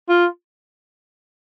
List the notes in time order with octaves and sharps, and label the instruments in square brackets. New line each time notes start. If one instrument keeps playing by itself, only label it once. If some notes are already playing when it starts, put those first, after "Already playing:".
[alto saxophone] F4